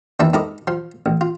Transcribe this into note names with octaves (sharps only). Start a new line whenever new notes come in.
D#2 E3 D4 E4 E5 A5
G#2 E4 A4 A#4 D#5 D6
F3 C6
A1
F4